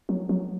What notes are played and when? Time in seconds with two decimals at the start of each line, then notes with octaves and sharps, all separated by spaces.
0.09 F#3
0.29 F#3